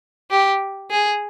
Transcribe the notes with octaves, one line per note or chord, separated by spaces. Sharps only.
G4
G#4